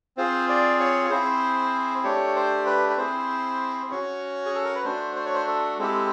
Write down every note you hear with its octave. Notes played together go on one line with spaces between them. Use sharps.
C4 F4 G#4 C5
D5
C#5
C#5
C4 E4 G#4 C5
A3 D4 G4 C#5
C5
B4
B4
C4 E4 G#4 C5
C#4 F#4 C#5
G#4
A4
A#4
B4
A3 D4 F#4 C5
C5
C#5
C5
A4
G#3 C4 E4 G4 A4